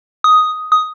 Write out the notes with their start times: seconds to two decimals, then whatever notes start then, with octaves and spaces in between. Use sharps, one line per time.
0.24 D#6
0.72 D#6